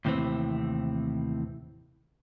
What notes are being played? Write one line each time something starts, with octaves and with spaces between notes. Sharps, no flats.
D#2 A2 C3 E3 C4